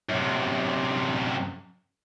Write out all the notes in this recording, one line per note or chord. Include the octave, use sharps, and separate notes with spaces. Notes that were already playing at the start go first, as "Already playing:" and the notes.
F#2 C3